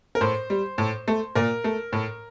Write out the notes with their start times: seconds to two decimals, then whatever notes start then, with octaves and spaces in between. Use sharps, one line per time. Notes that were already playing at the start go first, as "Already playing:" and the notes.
0.15 A#4
0.21 A2 C5
0.50 G3
0.78 A2
1.08 A3
1.35 A#2 A#4
1.64 A3
1.93 A2